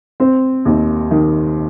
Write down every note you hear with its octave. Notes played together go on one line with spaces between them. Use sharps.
C4
D#2
D#3